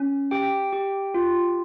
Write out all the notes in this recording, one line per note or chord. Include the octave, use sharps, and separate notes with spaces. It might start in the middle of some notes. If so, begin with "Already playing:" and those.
Already playing: C#4
G4 G5
G4
F4